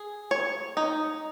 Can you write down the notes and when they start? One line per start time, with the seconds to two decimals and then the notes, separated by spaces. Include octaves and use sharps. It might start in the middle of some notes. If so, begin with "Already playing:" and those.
Already playing: G#4
0.31 C#5
0.77 D#4